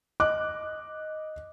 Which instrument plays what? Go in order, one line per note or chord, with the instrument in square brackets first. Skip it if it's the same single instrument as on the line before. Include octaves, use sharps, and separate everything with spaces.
[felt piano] D#5 D6 F#6